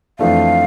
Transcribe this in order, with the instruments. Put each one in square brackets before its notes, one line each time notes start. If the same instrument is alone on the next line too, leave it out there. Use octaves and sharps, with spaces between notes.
[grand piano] F2 E3 A3 D4 [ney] F5